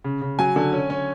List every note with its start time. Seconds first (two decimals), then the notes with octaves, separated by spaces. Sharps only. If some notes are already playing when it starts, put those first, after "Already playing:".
0.04 C#3
0.22 C#3
0.39 F#3 G#5
0.56 D3
0.73 C#4
0.90 C#4